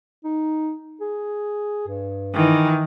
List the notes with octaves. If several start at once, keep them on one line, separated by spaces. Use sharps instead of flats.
D#4
G#4
G2
D#3 E3